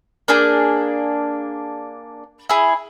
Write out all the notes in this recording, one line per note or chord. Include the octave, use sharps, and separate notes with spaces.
A#3 D4 G#4 G6
E4 G#4